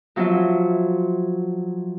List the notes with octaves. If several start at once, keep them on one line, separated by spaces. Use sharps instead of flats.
F3 F#3 C4 F4 E5